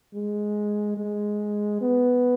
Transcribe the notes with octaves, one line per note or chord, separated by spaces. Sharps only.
G#3
G#3
B3